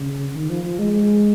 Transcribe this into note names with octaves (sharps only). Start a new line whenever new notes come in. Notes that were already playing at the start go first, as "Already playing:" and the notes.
Already playing: C#3
D#3
F3
F3
G#3
G#3